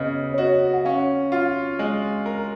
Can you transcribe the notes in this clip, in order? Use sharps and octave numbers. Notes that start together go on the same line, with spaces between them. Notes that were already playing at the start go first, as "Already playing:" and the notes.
Already playing: C#3 B3 D#5
C#5
F#4 D#5
F#5
C#4 F5
F4
G#3
A#4